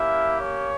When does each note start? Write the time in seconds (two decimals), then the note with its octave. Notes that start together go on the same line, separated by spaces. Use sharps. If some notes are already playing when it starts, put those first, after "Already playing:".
Already playing: A#3 C#4 E4 G4 E5
0.40 C#4 C#5